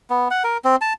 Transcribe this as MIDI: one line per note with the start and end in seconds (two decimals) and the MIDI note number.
0.10 0.28 59
0.31 0.43 78
0.44 0.57 70
0.65 0.76 60
0.81 0.93 81